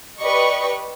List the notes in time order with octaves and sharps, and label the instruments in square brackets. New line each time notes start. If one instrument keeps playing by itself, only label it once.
[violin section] G4 B4 D5 D#5 C#6